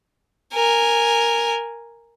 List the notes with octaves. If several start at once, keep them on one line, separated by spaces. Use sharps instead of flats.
A#4 G#5